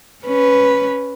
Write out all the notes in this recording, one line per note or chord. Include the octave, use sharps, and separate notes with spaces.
C#4 B4